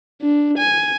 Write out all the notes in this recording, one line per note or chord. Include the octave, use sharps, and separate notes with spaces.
D4
G#5